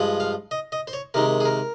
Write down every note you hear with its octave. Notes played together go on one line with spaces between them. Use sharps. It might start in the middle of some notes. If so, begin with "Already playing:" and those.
Already playing: G2 F3 G#3
F5
D#5
D#5
C5
C#5
C3 D#3 G#3 A#4
G#4
A#4